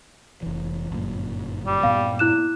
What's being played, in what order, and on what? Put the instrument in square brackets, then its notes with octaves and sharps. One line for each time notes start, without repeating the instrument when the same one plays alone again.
[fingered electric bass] F1 E3
G1 F#2 A#2
[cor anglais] G3
[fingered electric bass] G2 A#2 B3 [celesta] F5
[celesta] E4 F#6 E7